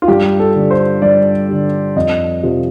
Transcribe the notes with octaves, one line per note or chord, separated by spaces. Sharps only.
F4
G2 G4
A4
D3 G3
C5
G2 D5
D3 G3
F2 D#5
C3 F3